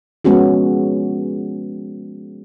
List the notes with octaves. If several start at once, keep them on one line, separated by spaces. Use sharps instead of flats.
F3 G#3 B3 C#4 F#4 G#4